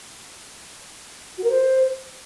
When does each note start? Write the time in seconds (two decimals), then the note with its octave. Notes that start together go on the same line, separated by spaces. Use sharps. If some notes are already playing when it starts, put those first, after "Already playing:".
1.37 F#4
1.43 A#4
1.49 C5